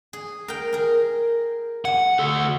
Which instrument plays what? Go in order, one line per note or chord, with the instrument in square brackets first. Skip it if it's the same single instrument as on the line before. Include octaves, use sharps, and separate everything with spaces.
[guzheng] G#4
A#4 G5
G#4 A#4
[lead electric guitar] F#5 [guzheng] G#5
[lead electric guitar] D2 A4